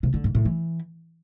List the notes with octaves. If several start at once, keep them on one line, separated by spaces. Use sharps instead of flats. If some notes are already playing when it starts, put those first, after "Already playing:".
C3
D3
G#2
A2
E3